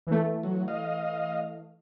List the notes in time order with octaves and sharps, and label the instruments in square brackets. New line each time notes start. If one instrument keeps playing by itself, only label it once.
[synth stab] E3 A3
[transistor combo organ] F#3
D#5 F5